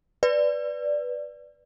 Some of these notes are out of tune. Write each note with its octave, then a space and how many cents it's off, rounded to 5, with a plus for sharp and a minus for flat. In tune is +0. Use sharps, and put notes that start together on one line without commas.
B4 +0 D5 +0